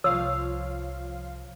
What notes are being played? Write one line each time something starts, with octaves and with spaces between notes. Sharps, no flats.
C2 F3 F4 C#5 F5 E6